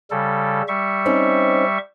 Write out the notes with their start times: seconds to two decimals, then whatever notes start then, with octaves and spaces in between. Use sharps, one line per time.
0.11 C#3 G3 A4
0.68 G3 E5 C#6
1.06 C4 C#4 D#4